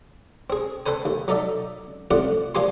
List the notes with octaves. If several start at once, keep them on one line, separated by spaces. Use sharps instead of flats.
C4 G#4
C4 A4 B4 C5 G#5
D#2
F#3 D#4 A4 D5 E5
C2 F2 A2 F4 D5 F#5
A#2 F3 G4 G#5 C6